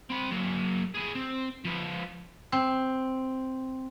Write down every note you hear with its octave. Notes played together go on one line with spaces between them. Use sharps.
C4 B5
F#3 A#3
G#4 B4
C4
F3 B4
C4